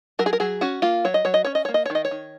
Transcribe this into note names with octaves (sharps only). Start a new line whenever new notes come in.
F#3 A#4
G#4
A#4
F#3 G#4
C#4 F#4
A#3 F4
F#3 C#5
D#5
F#3 C#5
D#5
C#4 C#5
D#5
A#3 C#5
D#5
C#5
D#3
D#5
C#5
D#3